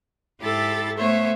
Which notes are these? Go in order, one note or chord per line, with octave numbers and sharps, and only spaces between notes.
G#2 E4 G4 A4 C6 A6
A3 B3 C5 C#5 E5